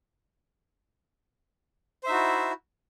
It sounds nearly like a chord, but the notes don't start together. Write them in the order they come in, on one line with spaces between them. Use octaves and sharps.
C5 E5 D#4 F#4 E4